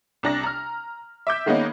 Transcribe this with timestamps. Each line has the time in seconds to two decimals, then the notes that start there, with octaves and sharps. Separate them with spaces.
0.23 C2 D4 A#6
0.43 A#5 F6
1.27 E5 D6 G6
1.46 D#3 G#3 A#3 B3 C#4 D#4